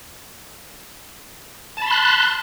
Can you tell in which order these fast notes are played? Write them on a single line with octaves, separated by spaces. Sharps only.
A5 B5 C6 F#6